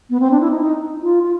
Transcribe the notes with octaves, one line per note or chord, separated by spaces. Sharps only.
B3
C4
D4
E4
D#4
D#4
F4
F4